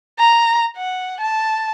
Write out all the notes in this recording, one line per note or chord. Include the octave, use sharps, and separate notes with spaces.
A#5
F#5
A5